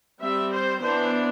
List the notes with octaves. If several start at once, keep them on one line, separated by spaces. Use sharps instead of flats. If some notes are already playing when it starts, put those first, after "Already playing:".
G3 C4 E5
C5
E3 B3 D4 C5